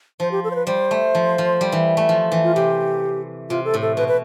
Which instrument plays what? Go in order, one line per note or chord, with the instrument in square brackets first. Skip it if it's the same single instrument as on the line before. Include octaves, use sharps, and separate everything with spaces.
[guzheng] F3 [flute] C5
[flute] G4
A4
C5
B4
[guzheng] G3 [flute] C5
[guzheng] A3
F3
F3
G3
E3
A3
F3
E3
[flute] F4
[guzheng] C3 [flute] G4
[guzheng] C3 [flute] F4
[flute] A4
[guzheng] A2
[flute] A4
[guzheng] B2 [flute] B4
[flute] B4